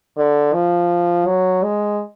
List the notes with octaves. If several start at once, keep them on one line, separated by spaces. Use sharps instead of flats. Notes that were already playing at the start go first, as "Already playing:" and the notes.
D3
F3
F#3
G#3